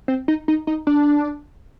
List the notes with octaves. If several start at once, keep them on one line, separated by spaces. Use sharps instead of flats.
C4
D#4
D#4
D#4
D4